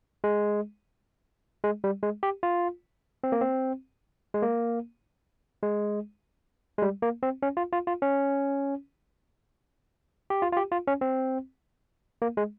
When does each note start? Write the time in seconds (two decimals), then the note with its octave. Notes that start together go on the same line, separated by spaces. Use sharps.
0.24 G#3
1.64 G#3
1.84 G3
2.03 G#3
2.23 G4
2.43 F4
3.24 C4
3.32 A#3
3.41 C4
4.34 G#3
4.42 A#3
5.63 G#3
6.78 G#3
6.82 G3
7.02 A#3
7.23 C4
7.42 C#4
7.57 F4
7.73 F4
7.87 F4
8.02 C#4
10.30 G4
10.42 F4
10.53 F4
10.57 G4
10.72 F4
10.87 C#4
11.01 C4
12.22 A#3
12.37 G#3